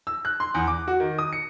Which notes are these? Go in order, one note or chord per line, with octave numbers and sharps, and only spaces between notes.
E6
F#6
C6
E2
D6
F#4
D#3
D#6
C#7